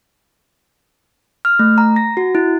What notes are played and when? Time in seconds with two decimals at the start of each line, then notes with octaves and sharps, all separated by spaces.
1.45 F6
1.59 A3
1.78 A#5
1.96 A#6
2.17 F#4
2.35 E4